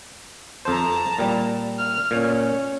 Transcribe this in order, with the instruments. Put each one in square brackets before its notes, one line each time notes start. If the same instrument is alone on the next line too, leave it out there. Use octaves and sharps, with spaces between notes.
[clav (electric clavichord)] F2 C5 [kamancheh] A5 A#5
[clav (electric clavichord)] A#2 G3
[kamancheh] F6
[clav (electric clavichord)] A#2 [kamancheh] C#4